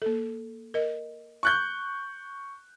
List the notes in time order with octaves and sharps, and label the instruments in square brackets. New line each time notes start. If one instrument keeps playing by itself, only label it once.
[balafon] A#3 A4
A#4 D#5
[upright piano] C#6 F#6 G6